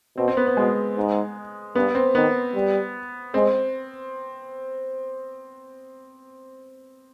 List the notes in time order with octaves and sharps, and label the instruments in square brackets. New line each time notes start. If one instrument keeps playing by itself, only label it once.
[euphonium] B2 [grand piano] C4
[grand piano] C4
B3
B3
[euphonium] B2 [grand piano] G#3
[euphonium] G#2
[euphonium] G2 [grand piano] B3
[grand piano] C4
[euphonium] D#3 [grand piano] B3
[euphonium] G3
[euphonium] G#3 [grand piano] C4